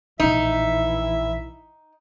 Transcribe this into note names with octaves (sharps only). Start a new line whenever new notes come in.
A#1 A2 E3 D#4 E4 E5